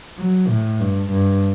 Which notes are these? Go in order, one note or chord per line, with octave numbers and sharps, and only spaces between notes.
F#3
A2
G2
G2